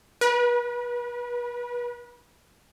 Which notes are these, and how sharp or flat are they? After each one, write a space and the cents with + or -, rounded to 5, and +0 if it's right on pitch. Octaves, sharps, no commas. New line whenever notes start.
B4 -35